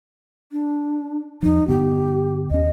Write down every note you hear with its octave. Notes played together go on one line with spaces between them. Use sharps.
D4
E2 F3 D#4
G2 D3 B3 G4
D#2 C#4 D#5